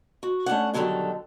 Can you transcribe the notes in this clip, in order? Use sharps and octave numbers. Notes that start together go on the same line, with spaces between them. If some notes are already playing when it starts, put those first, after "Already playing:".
F#4
A3 C#4 D4 F#5
B2 D3 D#3 F#3 G3 A4